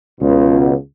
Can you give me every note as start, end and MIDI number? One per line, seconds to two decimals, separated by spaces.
0.21 0.72 37
0.21 0.72 47